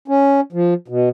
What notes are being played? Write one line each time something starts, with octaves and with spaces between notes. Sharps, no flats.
C#4
F3
B2